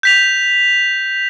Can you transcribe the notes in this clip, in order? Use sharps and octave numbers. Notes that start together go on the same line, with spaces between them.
G6 B6 F7